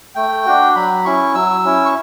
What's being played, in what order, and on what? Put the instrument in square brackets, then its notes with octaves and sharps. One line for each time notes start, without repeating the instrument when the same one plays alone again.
[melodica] A3 G5
D4 F#4
F#3 B5
C#4 E4 C#6
F#3 E6
C#4 E4
C#6